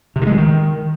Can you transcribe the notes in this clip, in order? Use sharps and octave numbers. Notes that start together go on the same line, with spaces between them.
C3
D#3
G#3
C3
D#3